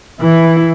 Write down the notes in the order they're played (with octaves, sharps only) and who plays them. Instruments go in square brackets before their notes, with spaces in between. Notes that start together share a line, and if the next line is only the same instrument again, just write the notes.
[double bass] E3 [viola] E4